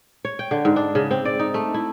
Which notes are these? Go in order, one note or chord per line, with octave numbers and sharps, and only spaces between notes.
C#5
G5
D3
G#2
D4
C#3
C4
D5
D#4
A3
E4